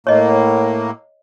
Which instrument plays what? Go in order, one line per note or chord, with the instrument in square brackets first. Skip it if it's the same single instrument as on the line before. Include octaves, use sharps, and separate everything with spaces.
[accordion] A2 A#3 [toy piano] C#5 D#5